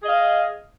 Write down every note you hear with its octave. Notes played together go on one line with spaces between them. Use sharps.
G#4 D#5 F5